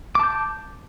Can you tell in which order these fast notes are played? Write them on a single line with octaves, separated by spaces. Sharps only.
D6 A5 G6